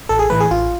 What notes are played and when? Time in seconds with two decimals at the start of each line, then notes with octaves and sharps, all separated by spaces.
0.09 A1 A4
0.19 G#4
0.30 A2 E3 A3 B4
0.40 G#4
0.51 A1 F4